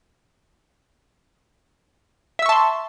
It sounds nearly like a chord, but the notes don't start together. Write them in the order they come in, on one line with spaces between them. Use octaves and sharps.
E5 E6 C#6 A5 C6